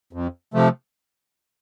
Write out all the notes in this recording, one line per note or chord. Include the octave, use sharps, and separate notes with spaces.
F2
C3 F3 A3